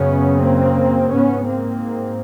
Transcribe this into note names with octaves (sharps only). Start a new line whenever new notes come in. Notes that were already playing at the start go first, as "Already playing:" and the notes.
Already playing: F#2 C#3 B3 C#4
A#3 C4
G#2 B3 C#4
A#3 C4